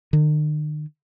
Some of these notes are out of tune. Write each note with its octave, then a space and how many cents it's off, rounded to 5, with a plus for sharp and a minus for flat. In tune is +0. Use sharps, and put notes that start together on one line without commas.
D#3 -45